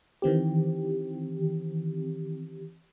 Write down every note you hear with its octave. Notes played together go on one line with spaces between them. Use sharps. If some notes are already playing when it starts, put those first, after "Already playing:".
D#3 E3 C4 G4